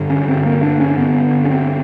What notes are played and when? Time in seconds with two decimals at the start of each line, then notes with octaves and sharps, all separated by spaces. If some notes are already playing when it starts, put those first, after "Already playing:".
Already playing: G2 D3
0.10 C#4
0.28 C4
0.45 A#3
0.63 D4
0.80 C#4
0.97 G2 D3 B3
1.45 C#4
1.50 C4